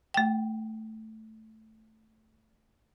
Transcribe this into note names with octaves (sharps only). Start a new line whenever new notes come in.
A3 G5